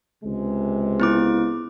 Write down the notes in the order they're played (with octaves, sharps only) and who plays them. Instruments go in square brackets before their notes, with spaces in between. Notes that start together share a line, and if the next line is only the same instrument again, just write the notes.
[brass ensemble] C#2 C3 G#3
[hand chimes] B3 E4 D6